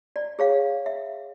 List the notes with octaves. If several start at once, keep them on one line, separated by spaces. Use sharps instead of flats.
D5
G#4 C#5 F5
E5